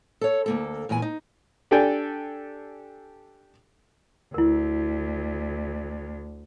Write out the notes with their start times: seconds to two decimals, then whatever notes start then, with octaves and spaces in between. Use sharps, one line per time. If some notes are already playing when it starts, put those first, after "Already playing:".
0.21 A4 C#5
0.46 D2 A#3 A4
0.89 E2 A#2 E3 G#5
1.02 D#4
1.71 D4 G4 A4 D5 G5 G#5
4.34 D2 E4 A#4